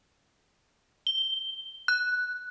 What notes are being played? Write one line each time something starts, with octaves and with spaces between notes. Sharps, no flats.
G7
F#6